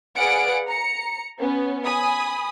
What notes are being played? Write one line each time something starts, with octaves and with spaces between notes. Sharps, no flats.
G#4 B4 D5 F5 F#5 D7
A#5 C#7
B3 C#4
G#5 B5 D#6